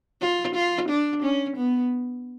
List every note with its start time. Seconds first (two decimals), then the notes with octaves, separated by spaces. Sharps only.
0.21 F4
0.55 F4
0.89 D4
1.23 C#4
1.57 B3